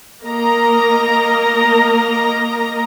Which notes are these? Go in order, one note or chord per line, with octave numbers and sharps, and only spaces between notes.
A#3 A#4 D#5 A#5